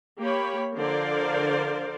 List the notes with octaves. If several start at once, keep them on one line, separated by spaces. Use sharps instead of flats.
A#3 G4 C#5 B5
D3 F3 A#4 C5 D5 F5